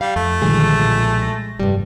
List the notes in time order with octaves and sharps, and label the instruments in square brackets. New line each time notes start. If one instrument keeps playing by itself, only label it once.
[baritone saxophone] G3 [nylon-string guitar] F5
[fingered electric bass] F2 [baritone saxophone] A3
[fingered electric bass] B1 F3 G3 [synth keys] A#2 D3 D#3 [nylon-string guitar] G#3 G#4
[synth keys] A#2
A#6
[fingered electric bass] F1 [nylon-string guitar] G2 G3